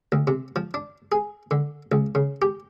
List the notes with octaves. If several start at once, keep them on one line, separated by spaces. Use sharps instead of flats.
D2
C3
F3
D4
G#4
D3
C#2
C#3
G4